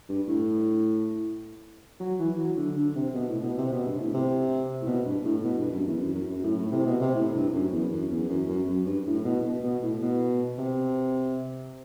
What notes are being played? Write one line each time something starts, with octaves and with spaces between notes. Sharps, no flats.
G2
A2
F#3
E3
F#3
D3
D3
C3
B2
A2
B2
C3
B2
G2
A2
C3
A2
B2
G2
A2
B2
G2
F#2
E2
F#2
F#2
F#2
A2
A2
C3
B2
C3
A2
G2
F#2
E2
F#2
E2
F#2
F#2
F#2
G2
A2
B2
B2
B2
A2
B2
C3